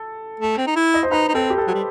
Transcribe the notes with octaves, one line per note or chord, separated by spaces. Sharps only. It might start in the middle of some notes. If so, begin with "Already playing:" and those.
Already playing: A4
A3
C4
D#4
E4
D#5
C5
D#4 B4
D#4
C4 A4
G4
A4
F#3
G3